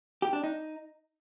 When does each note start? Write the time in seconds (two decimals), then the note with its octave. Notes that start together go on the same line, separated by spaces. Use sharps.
0.22 G4
0.33 D4
0.44 D#4